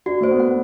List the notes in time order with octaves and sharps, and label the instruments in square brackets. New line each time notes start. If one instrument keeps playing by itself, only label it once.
[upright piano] D4 [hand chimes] F#4
[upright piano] A3 [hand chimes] C5
[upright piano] B3
[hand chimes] F#5
[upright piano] B3